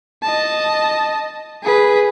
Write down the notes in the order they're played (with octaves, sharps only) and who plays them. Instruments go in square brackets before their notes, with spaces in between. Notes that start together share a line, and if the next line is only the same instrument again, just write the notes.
[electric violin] D#5 A5
G#4 B4